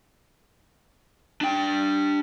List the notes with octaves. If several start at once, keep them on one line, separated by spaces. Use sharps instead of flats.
D4 G5